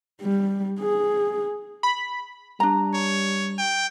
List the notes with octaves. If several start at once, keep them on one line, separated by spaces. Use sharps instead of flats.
G3
G#4
B5
G3 D4 A#5
C#5
G5